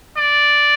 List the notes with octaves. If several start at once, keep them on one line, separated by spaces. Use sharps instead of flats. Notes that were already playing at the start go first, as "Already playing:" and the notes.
D5